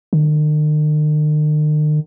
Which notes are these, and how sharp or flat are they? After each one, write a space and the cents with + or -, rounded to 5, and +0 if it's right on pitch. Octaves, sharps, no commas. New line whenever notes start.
D#3 -45